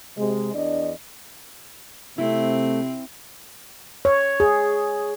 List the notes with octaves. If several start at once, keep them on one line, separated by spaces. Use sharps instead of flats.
C3 G#3
E2 D4 D5 D#5
C3 A3 C4 E4
C#5
G#4